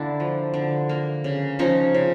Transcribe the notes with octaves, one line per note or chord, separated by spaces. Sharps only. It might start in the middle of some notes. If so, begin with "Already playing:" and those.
Already playing: D3 A#3 D4 E4
F3
D3
A#3
C#3
F3 C#4 D#4
C#3